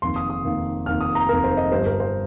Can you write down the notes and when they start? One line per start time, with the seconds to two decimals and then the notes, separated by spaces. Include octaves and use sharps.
0.02 F1 F2 D#3 A#3 C6
0.16 D#6
0.30 D#6
0.44 F1 F2 D#3 A#3
0.86 F1 F2 D#3 A#3 F6
1.01 D#6
1.15 A#5
1.29 F1 F2 D#3 A#3 A#4
1.44 C5
1.57 D#5
1.72 G1 G2 G3 C5
1.86 A#4
2.00 C5